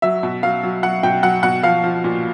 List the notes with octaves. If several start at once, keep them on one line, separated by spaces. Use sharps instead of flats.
F#3 E5
B2
F#3 F5
F#3
F#3 F#5
B2 G5
F#3 F#5
B2 F#5
F3 F5
F3
A#2